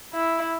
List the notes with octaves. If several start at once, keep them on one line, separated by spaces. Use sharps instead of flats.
E4